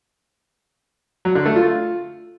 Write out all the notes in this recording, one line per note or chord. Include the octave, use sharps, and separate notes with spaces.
F#3
D3
A3
F4